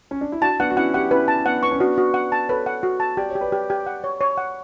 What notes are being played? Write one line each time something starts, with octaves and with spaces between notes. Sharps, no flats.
C#4
D4
E4
D4 F#4 A5
B3 D4 F#5
F#4
C#4 E4 F#5
E4 G4 F#5
C#4 E4 B4
A5
B3 D4 F#5
B3 C#6
C#4
B3 D4 F#4
F#4
F#5
A5
A4 B4 C#5
F#5
F#4
A5
G4 D5
C#5
G4
B4 D5
G4
G4
F#5
C#5
C#5
F#5